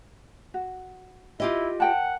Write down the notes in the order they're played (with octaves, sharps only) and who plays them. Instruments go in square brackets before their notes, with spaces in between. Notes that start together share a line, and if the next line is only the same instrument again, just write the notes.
[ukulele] F#4
[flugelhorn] E4 [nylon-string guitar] F4 G4 D#5
[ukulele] A#4 G5 A5 [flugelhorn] F#5